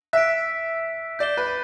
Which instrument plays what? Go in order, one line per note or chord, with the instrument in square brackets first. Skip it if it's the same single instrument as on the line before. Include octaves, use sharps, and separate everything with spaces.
[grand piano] E5 [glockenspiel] F#6 B6 D7
[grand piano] D5 [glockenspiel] G6 C7 E7 G7
[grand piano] B4